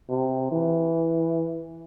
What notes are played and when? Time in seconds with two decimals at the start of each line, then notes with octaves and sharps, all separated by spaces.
0.10 C3
0.52 E3